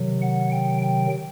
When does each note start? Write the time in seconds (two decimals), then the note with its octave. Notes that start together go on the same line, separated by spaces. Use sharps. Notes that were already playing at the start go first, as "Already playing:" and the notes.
Already playing: C3 D#3 F#3
0.22 F#5
0.52 G5
0.82 G5